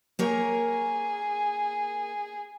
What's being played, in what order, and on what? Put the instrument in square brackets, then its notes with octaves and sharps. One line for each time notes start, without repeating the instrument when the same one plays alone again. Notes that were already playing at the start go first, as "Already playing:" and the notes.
[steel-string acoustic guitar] A#3 A#4 C#5 [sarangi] G#4